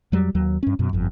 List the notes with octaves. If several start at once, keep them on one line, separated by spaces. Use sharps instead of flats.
F2 F#3 G3
D#2 F#3
G2 C#4
F#2 B2
G1 F2